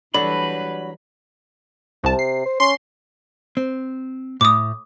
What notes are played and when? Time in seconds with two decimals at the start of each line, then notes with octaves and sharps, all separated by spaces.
0.14 E3 F#3 G3 D4 A4 B4 D5 B5
2.04 C2 C3 A5
2.19 C7
2.45 C5
2.60 C#4 C6
3.57 C4
4.41 A2 D6 D#6